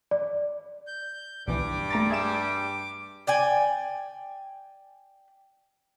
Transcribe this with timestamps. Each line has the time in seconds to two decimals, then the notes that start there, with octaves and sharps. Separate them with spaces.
0.11 D5
0.87 G6
1.48 B1 G2 E3 G3 D6
1.90 A3 A#5 A6
2.10 G#4 E5 E7
3.27 D5 G5 G#5